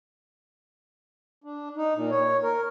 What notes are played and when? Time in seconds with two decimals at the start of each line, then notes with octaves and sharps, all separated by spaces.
1.44 D4
1.76 D#4
1.95 A#2
2.11 C#5
2.43 A#4